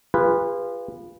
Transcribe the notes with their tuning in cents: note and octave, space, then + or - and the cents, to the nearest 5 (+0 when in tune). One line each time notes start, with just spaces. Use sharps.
F4 -10 G#4 -40 B4 -5